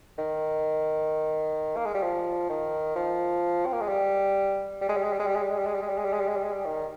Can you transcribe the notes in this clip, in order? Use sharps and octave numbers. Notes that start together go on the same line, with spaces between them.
D#3
A#3
G#3
G3
F3
D#3
F3
C4
A#3
G#3
G3
G3
G#3
G3
G#3
G3
G#3
G3
G#3
G3
G#3
G3
G#3
G3
G#3
G3
G#3
G3
G#3
G3
G#3
G3
G#3
G3
D#3